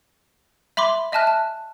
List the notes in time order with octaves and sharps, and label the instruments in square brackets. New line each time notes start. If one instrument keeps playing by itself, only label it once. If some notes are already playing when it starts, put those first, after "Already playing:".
[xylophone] E5 B5 C6 D6
D#5 E5 G#5 A5 F6 F#6
A5